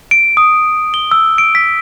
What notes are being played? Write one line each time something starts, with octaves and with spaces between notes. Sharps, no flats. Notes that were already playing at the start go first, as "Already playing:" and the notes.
D7
D#6
G7
E6
D7
B6